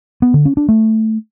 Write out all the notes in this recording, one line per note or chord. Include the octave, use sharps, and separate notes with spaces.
B3
D3
C#4
D4
A3